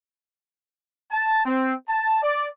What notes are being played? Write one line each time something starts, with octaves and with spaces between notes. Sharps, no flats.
A5
C4
A5
D5